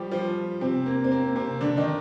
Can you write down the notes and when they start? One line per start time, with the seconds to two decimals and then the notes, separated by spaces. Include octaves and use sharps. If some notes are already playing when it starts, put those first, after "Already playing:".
Already playing: F3 G3 F4 G4
0.11 F3 F4
0.61 C3 C4
0.86 A#3
1.04 C4
1.12 A#3
1.36 C3 C4
1.61 D3 D4
1.77 D#3 D#4